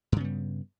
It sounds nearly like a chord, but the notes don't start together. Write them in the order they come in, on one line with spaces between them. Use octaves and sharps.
G2 C#3 B3 G3